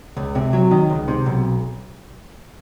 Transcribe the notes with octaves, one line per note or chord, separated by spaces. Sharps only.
C#2
C3
F#3
D#3
C#2
C3
B1